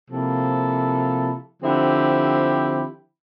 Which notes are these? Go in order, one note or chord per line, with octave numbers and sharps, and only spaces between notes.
C3 F3 A#3 E4 A4
D3 F3 C4 E4 G4